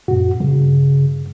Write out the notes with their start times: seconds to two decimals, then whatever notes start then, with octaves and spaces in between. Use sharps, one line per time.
0.08 F#2 A#2 F#4
0.40 G2 C#3